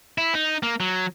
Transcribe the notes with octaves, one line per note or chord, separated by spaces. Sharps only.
E4
D#4
A#3
F#3